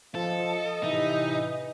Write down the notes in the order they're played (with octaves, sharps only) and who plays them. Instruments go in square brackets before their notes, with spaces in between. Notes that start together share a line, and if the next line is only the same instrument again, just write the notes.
[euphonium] F3 [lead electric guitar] A4 [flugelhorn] D#5
[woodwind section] A2 C3 E5 [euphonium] E3 [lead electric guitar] D#4